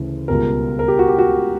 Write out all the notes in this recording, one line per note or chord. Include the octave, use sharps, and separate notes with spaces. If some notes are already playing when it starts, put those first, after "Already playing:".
Already playing: D2 C#3 E3
C#2 B2 G3 A#4
A#4
G4
F#4
G4
F#4